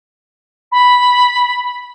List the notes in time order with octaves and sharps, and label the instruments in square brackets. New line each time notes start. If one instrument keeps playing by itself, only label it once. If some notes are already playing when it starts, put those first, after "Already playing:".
[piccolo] B5